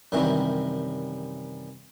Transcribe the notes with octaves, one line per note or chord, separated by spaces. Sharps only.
F#2 C3 D#3 E3 F#3 G3